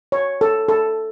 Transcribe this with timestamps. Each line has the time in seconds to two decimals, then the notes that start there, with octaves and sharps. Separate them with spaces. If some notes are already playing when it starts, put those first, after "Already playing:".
0.12 C#5
0.41 A4
0.69 A4